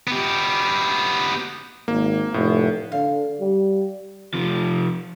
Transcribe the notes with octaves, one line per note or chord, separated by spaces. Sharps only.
B3 G4
G#1 A#3
F1 A2
D3 F5
G3
C3 F3